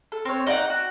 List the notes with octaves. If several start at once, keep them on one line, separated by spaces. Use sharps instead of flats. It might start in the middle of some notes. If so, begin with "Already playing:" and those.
A4
C4 C#5
D#4 D5 F5 F#5
F#4